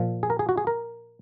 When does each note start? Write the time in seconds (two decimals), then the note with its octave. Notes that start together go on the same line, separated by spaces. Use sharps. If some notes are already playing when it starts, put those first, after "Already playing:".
Already playing: A#2 F3
0.23 G#4
0.30 A#4
0.39 G#4
0.49 F#4
0.58 G#4
0.67 A#4